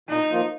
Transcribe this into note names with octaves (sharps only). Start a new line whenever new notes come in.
A#2 D#4
F3 A#3 F4